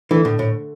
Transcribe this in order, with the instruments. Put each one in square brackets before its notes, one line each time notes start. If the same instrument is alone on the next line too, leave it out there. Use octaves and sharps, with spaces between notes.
[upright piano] D3 A3 D4 [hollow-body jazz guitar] E3
[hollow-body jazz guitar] A2
A2